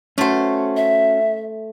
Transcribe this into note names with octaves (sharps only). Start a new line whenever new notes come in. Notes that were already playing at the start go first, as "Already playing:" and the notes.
A3 C#4 F#4 C5
E5